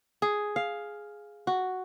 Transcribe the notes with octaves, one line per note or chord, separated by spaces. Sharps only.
G#4
F5
F#4